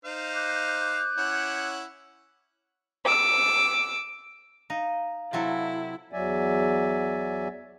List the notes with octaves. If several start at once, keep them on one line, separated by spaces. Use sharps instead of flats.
D#4 C5 F5
D6 F#6 G6
C#4 E4 F#5
D6 E6
D#4 F5
C3 F#3 E4 A4
E2 F#3 D5 E5 G#5